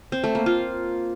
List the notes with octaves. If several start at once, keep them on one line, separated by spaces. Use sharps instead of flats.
C4
A3
A#3
F4